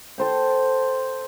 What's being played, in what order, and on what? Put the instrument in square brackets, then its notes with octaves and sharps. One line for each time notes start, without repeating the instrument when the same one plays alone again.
[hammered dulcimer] A4 C5 G5